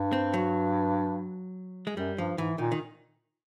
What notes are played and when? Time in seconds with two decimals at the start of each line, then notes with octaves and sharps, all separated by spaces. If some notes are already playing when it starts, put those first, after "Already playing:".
Already playing: G2
0.13 C4
0.34 F#3
1.87 G#3
1.97 F#2 G3
2.18 G2 F3
2.38 G#2 E3
2.58 A#2 D#3
2.72 D#3